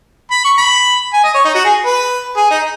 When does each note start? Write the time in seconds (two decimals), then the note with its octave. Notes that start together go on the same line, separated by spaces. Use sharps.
0.31 B5
0.45 C#6
0.57 B5
1.13 G#5
1.24 D#5
1.34 C#5
1.44 D#4
1.55 F#4
1.65 G#4
1.85 B4
2.37 G#4
2.51 D#4